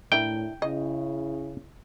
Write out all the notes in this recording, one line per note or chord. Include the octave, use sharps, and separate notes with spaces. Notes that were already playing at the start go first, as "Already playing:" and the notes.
A2 D4 E4 A#4 G5
C#3 E4 D#5